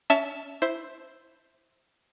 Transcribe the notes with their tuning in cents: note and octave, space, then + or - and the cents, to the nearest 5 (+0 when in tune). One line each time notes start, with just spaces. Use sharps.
C#4 +25 E5 +0 A5 +0
E4 +0 C5 +5